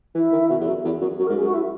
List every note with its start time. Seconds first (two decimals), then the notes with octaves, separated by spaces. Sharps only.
0.15 E3 E4
0.32 D#3
0.50 B2
0.60 E2
0.67 F#2
0.85 E2
1.01 F#2
1.19 F#2 F#4
1.27 A#4
1.30 G#2
1.36 G#4
1.41 F#2
1.45 F#4
1.53 E4